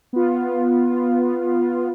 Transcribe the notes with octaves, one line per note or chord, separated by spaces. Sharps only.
B3 F4